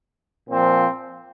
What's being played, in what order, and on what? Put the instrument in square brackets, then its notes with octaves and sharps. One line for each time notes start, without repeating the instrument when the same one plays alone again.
[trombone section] A#2 F3 C4